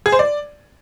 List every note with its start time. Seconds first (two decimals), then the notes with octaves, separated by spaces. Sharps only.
0.06 G#4
0.12 C5
0.19 D5